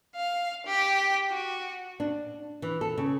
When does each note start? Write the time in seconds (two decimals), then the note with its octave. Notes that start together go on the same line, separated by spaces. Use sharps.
0.16 F5
0.66 G4
1.30 F#4
2.00 D4
2.62 E3
2.81 A4
2.98 C#3